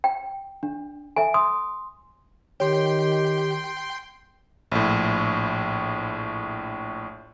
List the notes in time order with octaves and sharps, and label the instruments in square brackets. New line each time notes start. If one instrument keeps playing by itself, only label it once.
[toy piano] G5
[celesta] D4
[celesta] A4 E5 [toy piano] G#5
[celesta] C6 [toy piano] D#6
[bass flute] D#3 [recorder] G4 [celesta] C#5 [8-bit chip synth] G5 C6
[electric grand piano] A#1 A2